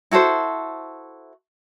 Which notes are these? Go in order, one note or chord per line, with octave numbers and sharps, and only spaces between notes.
E4 F#4 A4 C5